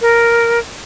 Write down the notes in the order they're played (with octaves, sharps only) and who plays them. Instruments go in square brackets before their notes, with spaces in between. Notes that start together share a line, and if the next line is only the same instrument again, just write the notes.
[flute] A#4